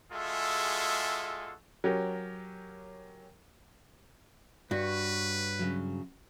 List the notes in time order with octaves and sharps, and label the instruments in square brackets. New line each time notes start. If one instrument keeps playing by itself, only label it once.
[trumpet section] G#3 F4 F#4 G#4 A4 E5
[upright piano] F#3 C#4 G4 A#4
[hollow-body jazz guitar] G2 [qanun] F#4 [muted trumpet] B4 [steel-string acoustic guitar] C#5
[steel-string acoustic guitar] C#3 F#3